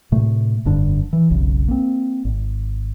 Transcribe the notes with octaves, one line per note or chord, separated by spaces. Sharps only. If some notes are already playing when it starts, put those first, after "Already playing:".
A2 C3 A3
F1 G2 D3 D4
E3
F1 B1 C#3
A#3 C4
G#1